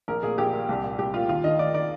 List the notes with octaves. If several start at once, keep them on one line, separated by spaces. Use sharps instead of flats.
A#1 A#4
A#2 G#4
A#1 G4
A#2
C2
A#2
C2 G4
A#2 F4
D#2 F4
D#3 D#5
D#2 D5
D#3 D5